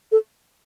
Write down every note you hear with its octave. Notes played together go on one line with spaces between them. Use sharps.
A4